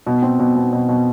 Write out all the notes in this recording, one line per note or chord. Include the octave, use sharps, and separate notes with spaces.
B2
C4
B2
B2
B2
B2